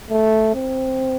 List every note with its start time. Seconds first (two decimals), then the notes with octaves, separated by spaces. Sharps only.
0.10 A3
0.55 C4